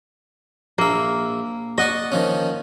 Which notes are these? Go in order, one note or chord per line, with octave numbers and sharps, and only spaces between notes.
A#1 A#3 E5
D5 D#5 F#5 C#6
D#3 F3 C#4